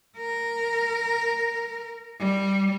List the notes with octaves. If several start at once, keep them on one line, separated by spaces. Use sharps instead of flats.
A#4
G3